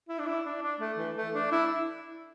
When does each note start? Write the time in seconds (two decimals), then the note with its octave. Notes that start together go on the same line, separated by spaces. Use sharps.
0.09 E4
0.19 D4
0.27 E4
0.45 D4
0.62 D4
0.80 A3
0.98 E3
1.16 A3
1.34 D4
1.51 E4